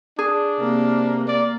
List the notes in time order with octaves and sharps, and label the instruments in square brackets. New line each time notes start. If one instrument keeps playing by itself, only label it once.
[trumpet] D4 [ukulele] G#4
[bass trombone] C3 [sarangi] A#3
[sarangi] A#3 [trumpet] D5